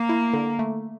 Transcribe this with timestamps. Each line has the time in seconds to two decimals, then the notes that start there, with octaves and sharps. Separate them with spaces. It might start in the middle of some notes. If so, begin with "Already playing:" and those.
Already playing: A#3
0.09 E4
0.34 D3
0.59 A3